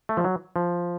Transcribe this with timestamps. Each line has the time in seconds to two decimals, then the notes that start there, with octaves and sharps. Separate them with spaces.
0.09 A3
0.17 F3
0.24 F#3
0.56 F3